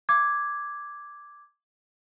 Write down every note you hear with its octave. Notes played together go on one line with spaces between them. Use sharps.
D6 G#6